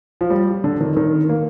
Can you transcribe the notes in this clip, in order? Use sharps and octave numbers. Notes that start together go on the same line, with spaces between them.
F3
G3
D3
D#3
D#3
A#3